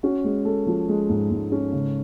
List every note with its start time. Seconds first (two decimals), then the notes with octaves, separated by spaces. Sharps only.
0.03 C#4 F#4
0.24 G#3
0.45 G#3 A4
0.67 F3
0.89 G#3
1.09 G#2
1.31 G#2
1.52 C#4
1.73 C#3